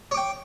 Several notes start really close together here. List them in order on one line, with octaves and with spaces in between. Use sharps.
C#5 D6 G5